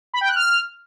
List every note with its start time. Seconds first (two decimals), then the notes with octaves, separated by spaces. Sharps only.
0.14 B5
0.21 G5
0.28 F#6
0.36 F6